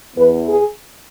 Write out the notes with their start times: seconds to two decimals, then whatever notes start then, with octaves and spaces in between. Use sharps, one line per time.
0.16 E2 E3 B3 B4
0.46 G#4